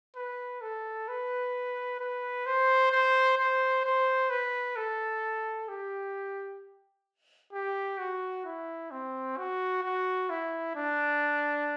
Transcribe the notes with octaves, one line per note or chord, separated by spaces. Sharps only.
B4
A4
B4
B4
C5
C5
C5
C5
B4
A4
G4
G4
F#4
E4
C4
F#4
F#4
E4
D4